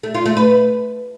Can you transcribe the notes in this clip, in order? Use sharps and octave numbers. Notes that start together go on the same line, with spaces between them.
A3
F4
A3
B4